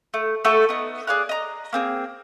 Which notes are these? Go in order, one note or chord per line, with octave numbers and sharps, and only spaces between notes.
A3
A3 F#4 A4
B3 D#4
G#4 D5 F5 F#6
D#5 A#5
A#3 C4 G#4